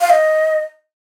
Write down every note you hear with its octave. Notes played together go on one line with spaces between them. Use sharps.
F5
D#5